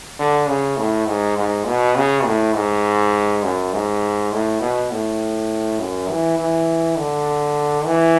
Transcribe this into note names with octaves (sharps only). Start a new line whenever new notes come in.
D3
C#3
A2
G#2
G#2
B2
C#3
A2
G#2
F#2
G#2
A2
B2
A2
F#2
E3
E3
D3
E3